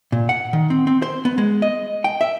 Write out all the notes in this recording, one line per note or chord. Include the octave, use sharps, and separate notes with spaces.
A#2
F#5
D#3
C4
C4
C5
B3
G#3
D#5
G5
E5